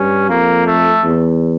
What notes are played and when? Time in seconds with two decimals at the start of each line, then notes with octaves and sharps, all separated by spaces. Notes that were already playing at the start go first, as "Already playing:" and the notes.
Already playing: G2 C#4
0.29 F2 A#3
0.67 A3
1.03 E2